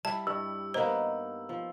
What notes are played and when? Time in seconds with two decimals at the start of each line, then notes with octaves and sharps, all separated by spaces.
0.05 G3 E4 A5
0.27 G2 E6
0.74 A#3 B3 D#4 C5
1.49 F3